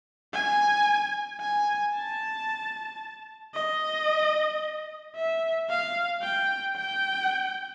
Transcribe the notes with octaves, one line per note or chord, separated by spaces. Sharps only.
G#5
G#5
A5
D#5
E5
F5
G5
G5